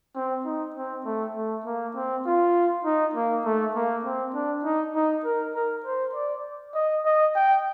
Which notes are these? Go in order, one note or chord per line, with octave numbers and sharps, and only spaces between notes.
C4
D#4
C4
A3
A3
A#3
C4
F4
D#4
A#3
A3
A#3
C4
D4
D#4
D#4
A#4
A#4
C5
D5
D#5
D#5
G5